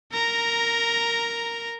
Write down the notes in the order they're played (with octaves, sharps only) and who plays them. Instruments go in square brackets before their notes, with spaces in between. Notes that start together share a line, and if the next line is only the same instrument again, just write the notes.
[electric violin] A#4 A#5